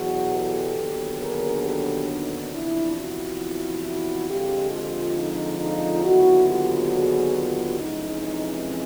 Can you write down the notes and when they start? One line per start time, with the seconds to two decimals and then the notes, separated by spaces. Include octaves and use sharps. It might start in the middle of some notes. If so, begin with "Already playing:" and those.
Already playing: E2 B2 F#3 F#4 G#4
0.32 G4 A4
0.76 D#2 D3 F#3 B3 D4
1.20 G#4 A#4
1.64 G4 A4
2.09 D#4
2.52 E2 C3 F3 D4 E4
2.96 E4 F#4
3.85 E4 F#4
4.29 F2 D3 F3 G#3 F4 G4
4.73 F4 G4
5.17 D#4
5.60 D#4 F4
6.04 D#2 D3 F#3 B3 E4 F#4
6.48 F4 G4
6.92 F#4 G#4
7.36 F4 G4
7.80 F2 C3 E3 G#3 C#4 D#4